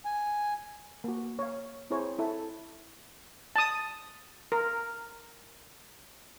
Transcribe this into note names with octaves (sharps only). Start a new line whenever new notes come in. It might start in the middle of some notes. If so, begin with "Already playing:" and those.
G#5
A#3 F#4
C#5 F5
C4 E4 G#4 C5 C#5
E4 A4 E5
A5 D#6
A#4